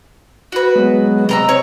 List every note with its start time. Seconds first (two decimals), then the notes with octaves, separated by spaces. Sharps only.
0.52 F#4 B4
0.75 F#3 G#3 B3
1.29 C3 D#5 A#5 E6
1.49 C4 C#5